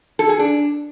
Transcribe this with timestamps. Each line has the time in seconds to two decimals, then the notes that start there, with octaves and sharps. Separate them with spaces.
0.19 A4
0.29 G#4
0.39 D4